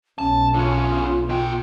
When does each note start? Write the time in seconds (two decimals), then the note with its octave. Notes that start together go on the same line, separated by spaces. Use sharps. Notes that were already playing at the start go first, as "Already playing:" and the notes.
0.19 B1 C#4 A5
0.55 D3 C#4 F4
1.29 B2 G5